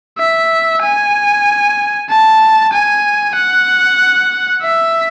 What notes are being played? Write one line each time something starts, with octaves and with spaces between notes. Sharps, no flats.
E5
G#5
A5
G#5
F#5
E5